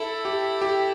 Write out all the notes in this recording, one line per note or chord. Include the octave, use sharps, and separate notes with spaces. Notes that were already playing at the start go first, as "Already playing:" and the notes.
Already playing: E4 A4
G4
G4